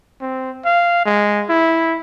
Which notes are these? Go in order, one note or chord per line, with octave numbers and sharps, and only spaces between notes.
C4
F5
G#3
E4